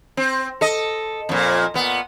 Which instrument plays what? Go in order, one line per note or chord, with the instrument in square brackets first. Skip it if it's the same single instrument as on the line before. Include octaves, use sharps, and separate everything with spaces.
[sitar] C4
A4 D#5
F2 A#2
A#2 B3